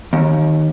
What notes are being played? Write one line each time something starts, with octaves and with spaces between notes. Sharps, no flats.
D#2